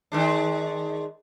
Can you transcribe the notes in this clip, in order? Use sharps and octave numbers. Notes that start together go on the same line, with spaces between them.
D#3 G#3 D4